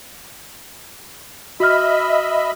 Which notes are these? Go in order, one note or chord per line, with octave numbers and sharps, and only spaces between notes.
F#4 D#5 E5 B5 F6